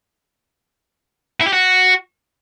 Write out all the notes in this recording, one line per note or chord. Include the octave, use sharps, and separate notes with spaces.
E4
G4
F#4